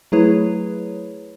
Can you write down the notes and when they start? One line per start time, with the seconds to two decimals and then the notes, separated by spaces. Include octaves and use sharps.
0.12 F#3 A3 E4 G#4 B4 C#5